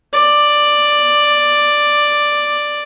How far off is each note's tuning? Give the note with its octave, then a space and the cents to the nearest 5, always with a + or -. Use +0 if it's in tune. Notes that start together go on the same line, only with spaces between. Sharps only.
D5 +5